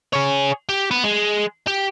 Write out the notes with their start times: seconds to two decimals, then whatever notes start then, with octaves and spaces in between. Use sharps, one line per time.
0.14 G#4 C#5
0.69 G4
0.91 B3
1.04 G#3
1.67 G4